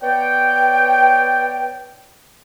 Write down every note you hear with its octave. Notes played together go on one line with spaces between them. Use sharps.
B3 C#5 D5 G5